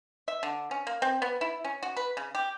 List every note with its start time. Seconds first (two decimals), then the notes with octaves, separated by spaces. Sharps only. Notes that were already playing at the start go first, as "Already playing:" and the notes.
0.28 E5
0.43 D3
0.71 C#4
0.87 A#3
1.02 C4
1.22 B3
1.41 E4
1.64 C#4
1.83 F#4
1.97 B4
2.17 C#3
2.35 G4